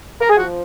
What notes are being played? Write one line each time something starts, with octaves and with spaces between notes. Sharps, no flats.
A#4
G#4
F3 F#4